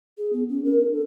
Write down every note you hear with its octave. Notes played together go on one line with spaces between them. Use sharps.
G#4
B3
C#4
A#4
D4
A4